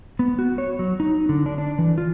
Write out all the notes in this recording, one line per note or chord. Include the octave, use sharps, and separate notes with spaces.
B3
F#4
C#5
F#3
D#4
D3
D4
D4
E3
F4